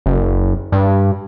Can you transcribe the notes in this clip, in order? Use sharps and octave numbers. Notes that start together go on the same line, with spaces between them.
F#1
G2